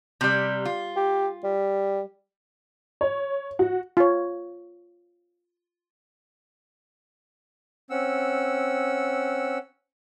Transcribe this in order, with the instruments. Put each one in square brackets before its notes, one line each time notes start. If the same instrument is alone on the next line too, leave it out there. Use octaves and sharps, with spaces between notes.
[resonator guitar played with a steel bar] C3 G3
F4
[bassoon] G4
G3
[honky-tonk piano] C#5
F#4
[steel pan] F4 C#5
[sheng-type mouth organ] C4 C#4 F#5 E6